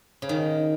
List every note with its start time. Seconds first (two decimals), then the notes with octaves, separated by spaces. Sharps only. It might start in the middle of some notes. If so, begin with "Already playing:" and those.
0.22 C#3
0.29 D#3